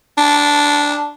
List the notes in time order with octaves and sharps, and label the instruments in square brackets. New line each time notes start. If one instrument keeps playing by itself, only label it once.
[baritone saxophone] D4